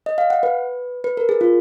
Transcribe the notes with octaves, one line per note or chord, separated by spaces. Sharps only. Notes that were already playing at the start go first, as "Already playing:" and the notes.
D#5
F5
F#5
B4
B4
A#4
G#4
F4